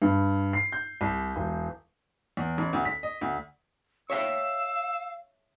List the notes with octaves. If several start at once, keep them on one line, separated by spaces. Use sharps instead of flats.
G2
C7
G6
C2
E1
E2
A1
D2
B6
D#5
D2
C#5 E5 F5 G5 E6